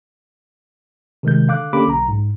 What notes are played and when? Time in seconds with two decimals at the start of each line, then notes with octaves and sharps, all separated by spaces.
1.23 C3 D#3 G#3 G6
1.48 D3 F5 D6 F#6
1.73 D3 A#3 C#4 G4 B5 D6
1.87 B1 A#5
2.08 G#2